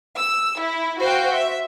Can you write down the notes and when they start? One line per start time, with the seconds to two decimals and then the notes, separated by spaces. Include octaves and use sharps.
0.18 E6
0.61 E4
1.00 F#4 C5 F5 G5
1.33 E5